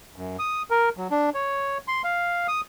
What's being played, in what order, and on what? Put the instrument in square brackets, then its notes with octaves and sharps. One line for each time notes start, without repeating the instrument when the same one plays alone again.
[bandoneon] F#2
D#6
A#4
F#3
D4
C#5
C6
F5
D#6